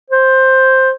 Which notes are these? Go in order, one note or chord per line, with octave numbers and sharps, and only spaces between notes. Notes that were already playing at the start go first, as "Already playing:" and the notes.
C5